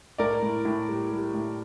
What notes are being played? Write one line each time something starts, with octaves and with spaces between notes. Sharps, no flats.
A2 A#4 D5
A2
A2
G3
G3
A2